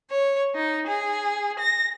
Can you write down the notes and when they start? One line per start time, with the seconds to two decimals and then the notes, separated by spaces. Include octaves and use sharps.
0.11 C#5
0.56 D#4
0.88 G#4
1.59 A#6